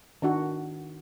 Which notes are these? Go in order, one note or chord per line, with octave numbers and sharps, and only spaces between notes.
D#3 D4 F#4